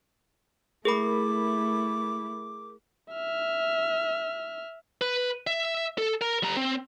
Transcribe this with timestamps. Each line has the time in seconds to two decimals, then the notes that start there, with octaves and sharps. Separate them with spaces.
0.85 A3 E4 G#4 A#4 B5 D6
3.12 E5 F6
5.01 B4
5.47 E5
5.98 A4
6.21 A#4
6.43 G3 A#5
6.57 C4